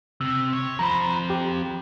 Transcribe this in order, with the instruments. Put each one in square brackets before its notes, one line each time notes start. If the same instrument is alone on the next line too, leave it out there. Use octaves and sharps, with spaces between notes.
[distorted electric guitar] C3 C4 [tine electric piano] E6
[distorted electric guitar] C#5
[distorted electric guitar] F2 C5 [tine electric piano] A#5 B5
[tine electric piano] G4